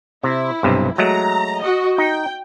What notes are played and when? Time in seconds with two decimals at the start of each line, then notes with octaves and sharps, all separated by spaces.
0.24 C3 E4
0.63 B1 G2 C3
0.98 F#3 G#3 A3 A#5
1.61 F#4 D#5
1.98 D#4 G5